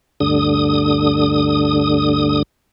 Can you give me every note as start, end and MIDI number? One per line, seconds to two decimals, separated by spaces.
0.20 2.42 38
0.20 2.42 43
0.20 2.42 50
0.20 2.42 87